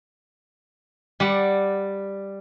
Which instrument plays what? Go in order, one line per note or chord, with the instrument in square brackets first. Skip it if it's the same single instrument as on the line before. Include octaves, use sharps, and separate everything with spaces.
[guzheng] G3 D5 F#5